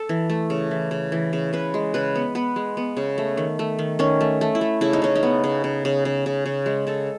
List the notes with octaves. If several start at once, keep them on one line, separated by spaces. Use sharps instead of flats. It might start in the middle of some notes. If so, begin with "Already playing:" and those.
Already playing: A4
E3
A3
C#3
E3
C#3
E3
C#3
C#3 B4
G#3
C#3 B4
B3
B3 B4
G#3
B3
C#3
A3
D#3
A3
D#3
D#3 C#4
A3
A3
E4
A3
C#3 E4
D#4
C#3 C#4
D#4
B3
C#3
C#3
C#3
C#3
C#3
C#3
G#3
C#3 A4